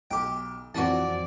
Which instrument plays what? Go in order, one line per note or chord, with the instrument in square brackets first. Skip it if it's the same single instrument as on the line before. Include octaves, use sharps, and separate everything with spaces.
[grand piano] B1 [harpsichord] G4 G5
[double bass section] F2 F3 C4 [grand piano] E3 [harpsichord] F#4 A5 [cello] D5